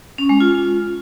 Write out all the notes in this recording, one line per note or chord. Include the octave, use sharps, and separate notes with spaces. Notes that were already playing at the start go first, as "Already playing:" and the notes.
C#4
G#3
F4